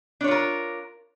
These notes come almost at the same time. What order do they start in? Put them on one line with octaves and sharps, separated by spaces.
D4 C#5 F4 A#4